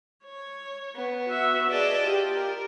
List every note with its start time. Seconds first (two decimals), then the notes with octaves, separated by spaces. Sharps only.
0.25 C#5
0.95 B3
1.26 F#4 E5
1.70 G#4 D5 D#5 A5
2.03 F4 G4
2.36 A#4